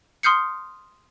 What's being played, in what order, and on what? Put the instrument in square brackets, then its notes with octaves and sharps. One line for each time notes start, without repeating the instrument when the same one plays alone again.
[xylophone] C6 D#6 F6 G6 C7 C#7